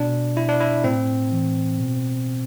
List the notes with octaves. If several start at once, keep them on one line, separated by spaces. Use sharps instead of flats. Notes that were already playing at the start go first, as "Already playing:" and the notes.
Already playing: B2 D4
E4
D4
E4
A2 C4
E3
B2